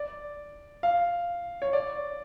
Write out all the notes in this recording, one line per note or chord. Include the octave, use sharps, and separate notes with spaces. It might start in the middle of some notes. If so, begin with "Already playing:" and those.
Already playing: D5
F5
C#5
D5